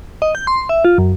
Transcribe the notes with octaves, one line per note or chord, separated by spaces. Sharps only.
D#5
G6
C6
E5
F4
F#2